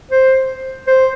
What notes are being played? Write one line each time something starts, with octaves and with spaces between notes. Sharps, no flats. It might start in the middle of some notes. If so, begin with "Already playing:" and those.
C5
C5